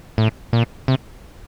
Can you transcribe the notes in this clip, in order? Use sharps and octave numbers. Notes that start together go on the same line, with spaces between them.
A2
A#2
C3